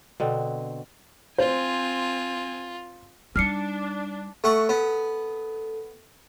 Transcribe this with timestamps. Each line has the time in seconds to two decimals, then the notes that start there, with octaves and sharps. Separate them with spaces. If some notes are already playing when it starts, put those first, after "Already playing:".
0.20 B2 D3 C4
1.38 C4 F4 C5 G#5
3.36 G3 D4 D#4 F6 C7 C#7
4.44 A3 A4 F#5 C#6
4.69 B3 A4